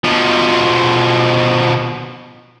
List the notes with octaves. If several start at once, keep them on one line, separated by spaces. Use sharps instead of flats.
B2 F3